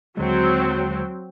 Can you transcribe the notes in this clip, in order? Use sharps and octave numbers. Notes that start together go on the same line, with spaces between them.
D#2 D3 F#3 G#3 C4